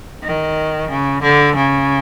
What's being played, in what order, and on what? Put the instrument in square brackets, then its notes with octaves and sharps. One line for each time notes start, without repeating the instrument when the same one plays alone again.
[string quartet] D#3
C#3
D3
C#3